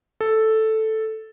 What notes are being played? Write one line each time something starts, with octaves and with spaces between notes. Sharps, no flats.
A4